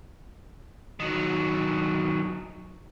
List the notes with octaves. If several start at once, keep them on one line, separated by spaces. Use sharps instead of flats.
D#3 F#3